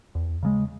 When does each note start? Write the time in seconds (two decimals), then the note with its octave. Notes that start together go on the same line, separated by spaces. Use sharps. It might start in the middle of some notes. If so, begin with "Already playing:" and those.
0.15 E2
0.43 C#3 F3 G#3